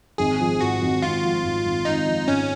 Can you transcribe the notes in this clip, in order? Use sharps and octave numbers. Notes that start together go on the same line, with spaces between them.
G#1 G#4
F3
G#2 F#4
G#1
G#1 F4
F3
G#2
G#1
G#1 D#4
F3
G#2 C#4